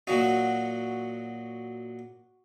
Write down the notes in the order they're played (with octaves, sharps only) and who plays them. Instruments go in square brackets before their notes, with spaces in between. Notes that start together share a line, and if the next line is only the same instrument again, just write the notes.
[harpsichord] A#2 F#3 D#4 [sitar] F#4